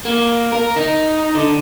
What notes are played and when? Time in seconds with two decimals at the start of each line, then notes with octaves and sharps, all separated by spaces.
0.05 A#3
0.52 A#4
0.76 D#4
1.35 D3